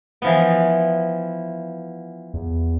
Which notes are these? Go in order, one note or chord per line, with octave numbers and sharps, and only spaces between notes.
E3 F3 B3
E2